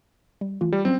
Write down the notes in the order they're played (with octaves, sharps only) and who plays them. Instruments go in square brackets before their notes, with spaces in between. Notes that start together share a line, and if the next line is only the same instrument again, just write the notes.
[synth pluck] G3
E3 A3 F4
[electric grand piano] G3
[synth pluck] F#3 C#4 [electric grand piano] C4